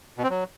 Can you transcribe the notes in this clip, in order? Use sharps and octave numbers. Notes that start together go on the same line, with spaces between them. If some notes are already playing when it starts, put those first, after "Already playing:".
B2
C4
F#3